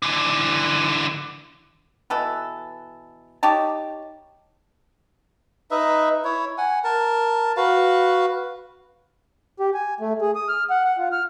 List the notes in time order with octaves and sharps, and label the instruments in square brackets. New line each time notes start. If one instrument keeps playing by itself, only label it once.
[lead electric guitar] D3 E3
[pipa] B2 E3 A4
D#4 G4 C#5 A5
[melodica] D#4 B4 D#5 E5
E4 C#5
F#5 G#5
A#4 A5
F#4 B4 F5
[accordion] G4
G#5
A3
G#4
D#6
F6
F#5
F#5
F4
F6